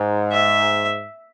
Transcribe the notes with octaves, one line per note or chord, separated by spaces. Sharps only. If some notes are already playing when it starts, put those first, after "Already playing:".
Already playing: G#2
E5